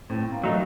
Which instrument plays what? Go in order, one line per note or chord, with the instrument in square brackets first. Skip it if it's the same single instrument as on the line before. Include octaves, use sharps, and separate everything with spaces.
[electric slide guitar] A2 [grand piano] C4
[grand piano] A#3
[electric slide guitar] F#3 A3 D#4